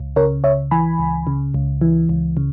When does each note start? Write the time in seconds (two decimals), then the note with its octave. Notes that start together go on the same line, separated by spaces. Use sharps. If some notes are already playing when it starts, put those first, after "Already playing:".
Already playing: C#2
0.16 C#3 A#4 C#5
0.44 C#2 C#5 E5
0.71 E3 G#5 B5
0.99 C#2
1.27 C#3
1.54 C#2
1.81 E3
2.09 C#2
2.37 C#3